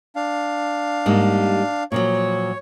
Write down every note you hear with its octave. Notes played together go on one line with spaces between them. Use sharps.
D4 F5
G#2 G3 A#3
A#2 F3 F#3 C#5